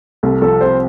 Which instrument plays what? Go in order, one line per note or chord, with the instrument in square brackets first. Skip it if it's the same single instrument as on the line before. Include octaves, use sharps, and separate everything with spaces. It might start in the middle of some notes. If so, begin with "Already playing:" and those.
[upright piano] C2 [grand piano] A4
[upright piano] F3 [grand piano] A4
[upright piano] C4 [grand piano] C5